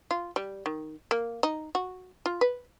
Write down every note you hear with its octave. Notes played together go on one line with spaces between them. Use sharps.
F4
G3
D#3
A#3
D#4
F#4
F4
B4